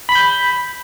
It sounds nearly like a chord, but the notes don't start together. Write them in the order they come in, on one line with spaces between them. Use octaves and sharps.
B5 B6 G6